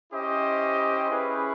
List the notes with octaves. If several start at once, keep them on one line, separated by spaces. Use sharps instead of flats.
C#4 E4 G4 C5 D#5
C#4 E4 G#4 B4